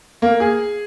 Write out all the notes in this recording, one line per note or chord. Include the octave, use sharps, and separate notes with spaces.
A#3
G#4